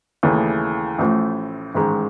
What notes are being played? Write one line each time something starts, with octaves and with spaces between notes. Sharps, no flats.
D#2 C#3 E3 A3
A1 A2 F3 A3
A1 G#2 D#3 G#3